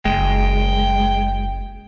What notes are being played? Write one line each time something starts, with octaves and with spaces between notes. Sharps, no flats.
F#1 G#3 G5